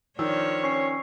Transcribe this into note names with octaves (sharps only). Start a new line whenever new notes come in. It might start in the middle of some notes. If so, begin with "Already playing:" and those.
D#3 F3 D4 C#5 E6
C#4 C#6 C7